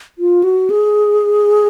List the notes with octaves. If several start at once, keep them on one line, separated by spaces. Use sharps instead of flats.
F4
F#4
G#4